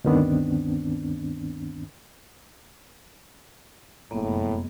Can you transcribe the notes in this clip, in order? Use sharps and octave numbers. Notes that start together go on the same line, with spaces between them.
D2 G2 D#3 B3 C4 D4
F1 F#2 A2 G#3 A#3 B3